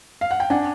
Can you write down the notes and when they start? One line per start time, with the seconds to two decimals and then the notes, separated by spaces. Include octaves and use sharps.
0.21 F5
0.31 F#5
0.40 G5
0.50 D4 F#5 G#5